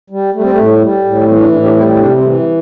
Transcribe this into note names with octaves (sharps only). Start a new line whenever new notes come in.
G3
G3 A3
C4
A3
A2
G3
A2
E3 G3 C4
A3 D4
A2 A3 D4
D4 G4
G3 C4 E4
C4
C3 A3 D4
C4
E3 A3
G3